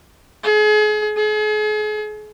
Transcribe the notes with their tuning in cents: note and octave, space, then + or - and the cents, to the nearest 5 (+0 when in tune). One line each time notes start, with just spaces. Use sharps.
G#4 +35
G#4 +40